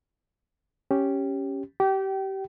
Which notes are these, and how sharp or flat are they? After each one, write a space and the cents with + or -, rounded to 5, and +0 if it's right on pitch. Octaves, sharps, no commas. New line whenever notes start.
C#4 -5 G4 -5
G4 -25 G5 -30